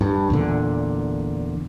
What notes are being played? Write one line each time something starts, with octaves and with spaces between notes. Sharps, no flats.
G2
E2 A#2 D3